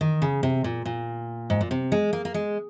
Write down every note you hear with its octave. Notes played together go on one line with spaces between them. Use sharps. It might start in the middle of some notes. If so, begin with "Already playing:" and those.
D#3
C#3
C3
A#2
A#2
G#2
A#2
C3
G#3
A#3
A#3
G#3